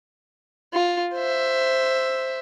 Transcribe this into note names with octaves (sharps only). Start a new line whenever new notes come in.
F4
C5 E5